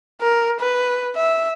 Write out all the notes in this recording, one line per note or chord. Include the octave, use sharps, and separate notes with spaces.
A#4
B4
E5